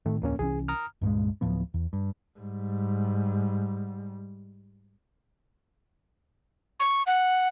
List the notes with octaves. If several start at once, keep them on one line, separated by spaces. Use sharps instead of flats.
A2 D#3 A3
D1 F2 A#3 C#4
C2 E3 C#4 G#4
A#5 D#6 F6
C#2 G2 A#2 G#3
D1 A2 F3 B3
E2
G2
G#2 G3
C#6
F#5